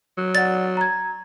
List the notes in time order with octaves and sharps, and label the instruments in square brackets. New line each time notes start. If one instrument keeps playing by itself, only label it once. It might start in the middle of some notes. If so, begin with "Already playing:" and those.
[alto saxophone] F#3
[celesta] D5 F#5 [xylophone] A6
[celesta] A#5 G#6